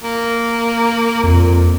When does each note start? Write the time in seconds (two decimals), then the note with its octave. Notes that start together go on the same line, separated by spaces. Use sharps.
0.03 A#3
1.23 F2 A#2